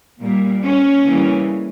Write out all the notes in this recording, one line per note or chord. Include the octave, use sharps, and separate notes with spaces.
A#2 G3 A#3
C#4
C#3 E3 G3 A#3